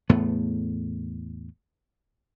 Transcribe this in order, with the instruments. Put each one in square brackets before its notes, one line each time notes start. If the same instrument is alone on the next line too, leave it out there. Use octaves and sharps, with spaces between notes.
[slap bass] E2 A2 A3 B3